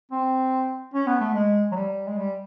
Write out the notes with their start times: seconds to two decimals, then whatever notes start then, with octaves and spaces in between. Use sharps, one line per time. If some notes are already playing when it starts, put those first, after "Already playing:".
0.11 C4
0.94 C#4
1.07 B3
1.21 A3
1.35 G#3
1.72 F#3
1.76 G3
2.07 G#3
2.17 G3